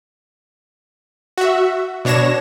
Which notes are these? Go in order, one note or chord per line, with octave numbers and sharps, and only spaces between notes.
F#4 E5
B2 D4 C#5 A#6 E7